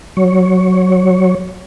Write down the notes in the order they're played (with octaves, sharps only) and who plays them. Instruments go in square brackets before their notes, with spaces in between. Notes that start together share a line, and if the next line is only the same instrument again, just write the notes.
[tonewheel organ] F#3 C#5